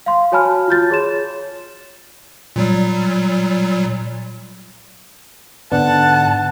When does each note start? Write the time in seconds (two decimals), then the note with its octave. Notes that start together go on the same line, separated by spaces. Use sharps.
0.06 F5 C6
0.32 F#4 C#5 G#5 A5 B5 F6
0.68 F4 A5 G6 A6
0.90 G#4 C#5 C6 E7
2.56 A#2 F#3 G3
5.72 G#2 D3 B3 D4 F#5 A5